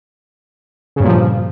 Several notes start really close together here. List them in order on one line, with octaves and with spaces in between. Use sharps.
C#3 G2 A#2 F3